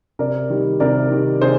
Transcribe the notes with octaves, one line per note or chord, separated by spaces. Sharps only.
C3 A#4 D5
D#3 G3
C3 A#4 D5
D#3 G3
C3 G#4 C5